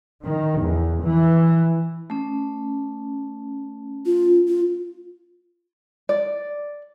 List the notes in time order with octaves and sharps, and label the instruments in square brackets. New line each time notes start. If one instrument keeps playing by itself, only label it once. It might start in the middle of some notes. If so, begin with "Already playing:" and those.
[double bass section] D#3
E2
E3
[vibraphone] A3 C#4
[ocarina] F4
F4
[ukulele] D5